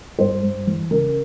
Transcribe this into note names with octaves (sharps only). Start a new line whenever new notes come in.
G2 C5
G2
E3
C#3 A#4